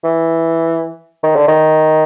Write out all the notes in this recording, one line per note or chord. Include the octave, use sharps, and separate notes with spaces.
E3
D#3
D3
D#3